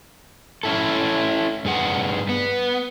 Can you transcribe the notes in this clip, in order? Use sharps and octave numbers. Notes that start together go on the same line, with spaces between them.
C#4 E4 A4
G2 G#4 F#5
B3